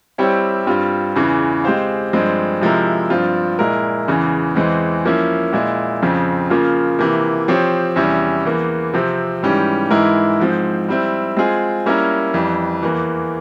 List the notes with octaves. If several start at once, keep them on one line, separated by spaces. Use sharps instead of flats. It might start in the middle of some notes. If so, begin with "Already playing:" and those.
G3 C4 E4 G4 C#5
G2 G3 C4 F4
E2 C#3 E3
G#3 C4 G4 C5 F5
G2 F3 G#3 C4
C3 F3 G#3 E4 A#4
G2 F3 C4 F4
A#2 G#3 E4 A#4
E2 C#3 E3
E2 E3 G#3 C4
F3 A#3 C#4 E4
A#2 G#3 E4
F2 C#3 F3 C4
C#3 F3 A#3 F4
C3 E3 A#3
F3 C4 G4 C#5
E2 C3 G3 C#4 E4
E2 E3 A#3
C3 F3 C4
G#2 E3 G3 C#4 G4
G#2 E3 G#3 E4 A#4
G#2 F3 C4
G3 C4 E4
G#3 C4 F4 G#4
G3 A#3 C#4 E4 A#4
F2 E3 G3
E2 E3 A#3